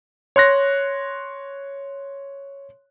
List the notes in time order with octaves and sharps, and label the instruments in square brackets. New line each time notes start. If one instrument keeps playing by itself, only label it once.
[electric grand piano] C#5 C6 F#6 A#6